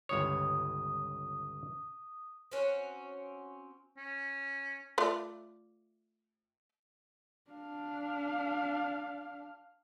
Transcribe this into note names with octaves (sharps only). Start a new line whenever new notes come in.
G1 C#2 C#5 D#6
C4 C#4 F#4
C#4
A3 F4 D5
D4 F5